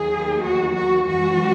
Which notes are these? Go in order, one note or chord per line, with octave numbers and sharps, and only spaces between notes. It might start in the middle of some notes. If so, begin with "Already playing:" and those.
Already playing: D#2 D#3 F#3 G#4
F#4
F#4
F#2 E3 G#3 F#4